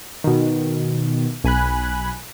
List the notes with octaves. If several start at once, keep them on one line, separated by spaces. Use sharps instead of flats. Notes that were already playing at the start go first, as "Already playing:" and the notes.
B2 D#3
B1 G#5 B5 F#6